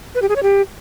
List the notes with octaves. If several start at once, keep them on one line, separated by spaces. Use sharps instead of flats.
B4
G4
G#4
C#5
G4